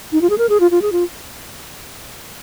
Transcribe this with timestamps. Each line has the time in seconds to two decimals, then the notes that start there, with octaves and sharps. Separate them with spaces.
0.12 D#4
0.21 F4
0.30 G#4
0.38 A#4
0.49 G#4
0.60 F4
0.71 F4
0.82 G#4
0.92 F4